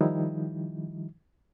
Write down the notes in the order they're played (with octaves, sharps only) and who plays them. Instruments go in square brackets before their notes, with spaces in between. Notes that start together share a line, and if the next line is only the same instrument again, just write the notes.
[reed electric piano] D#3 F3 G3 D#4 E4